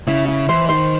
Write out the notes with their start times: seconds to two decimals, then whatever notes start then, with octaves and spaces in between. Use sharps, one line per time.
0.07 C#3 E4
0.28 E4
0.49 E3 C5
0.69 D#3 C5